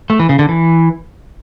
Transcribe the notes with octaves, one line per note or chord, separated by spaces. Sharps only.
A3
E3
C#3
D3
E3